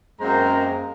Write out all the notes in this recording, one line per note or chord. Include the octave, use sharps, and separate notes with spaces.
F#2 G#3 A#3 C4 C5 A#5